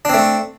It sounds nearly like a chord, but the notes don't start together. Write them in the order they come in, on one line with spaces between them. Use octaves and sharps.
D4 C4 A3